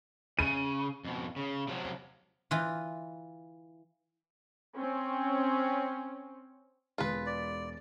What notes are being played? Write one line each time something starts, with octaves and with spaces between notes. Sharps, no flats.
C#3 D#7
F2 B2
C#3
C3 F3 F#3
E3 F4
C4 C#4
E1 G#3 F4 G#4 B4
D5